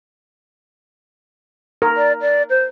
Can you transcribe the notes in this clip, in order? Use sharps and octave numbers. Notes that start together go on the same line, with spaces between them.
A#4
D5
D5
C5